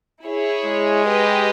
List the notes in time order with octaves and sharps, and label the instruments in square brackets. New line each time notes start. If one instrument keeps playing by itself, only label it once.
[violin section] E4 G#4 C#5
[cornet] G#3
[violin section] G4 B4 D#5